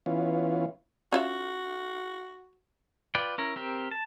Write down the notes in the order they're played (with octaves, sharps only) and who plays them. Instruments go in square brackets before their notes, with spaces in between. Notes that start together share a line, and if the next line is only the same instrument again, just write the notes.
[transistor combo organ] E3 B3 C#4 F4
[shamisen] C#4 F4 E5 [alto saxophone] F#4
[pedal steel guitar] F4 B4 D5 G5
C#4 E4 A#4
C4 G4 A#4
A5